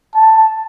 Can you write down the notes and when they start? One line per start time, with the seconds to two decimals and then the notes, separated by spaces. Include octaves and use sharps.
0.15 A5